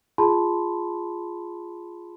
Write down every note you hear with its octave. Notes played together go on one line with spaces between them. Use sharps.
F4 G#4 A5 B5 C6